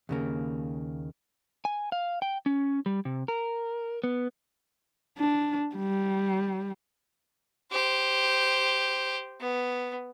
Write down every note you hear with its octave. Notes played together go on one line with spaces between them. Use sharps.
D#2 C#3 A#3
G#5
F5
G5
C#4
G3
C3
A#4
B3
D4
G3
G4 C5
B3